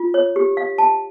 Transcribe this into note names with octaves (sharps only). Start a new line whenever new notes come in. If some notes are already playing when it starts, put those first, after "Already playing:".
Already playing: F4
C#5
G4
F5
A5